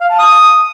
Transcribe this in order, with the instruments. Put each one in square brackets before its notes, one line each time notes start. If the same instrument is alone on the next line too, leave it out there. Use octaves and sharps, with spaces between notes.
[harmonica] F5
A5
D#6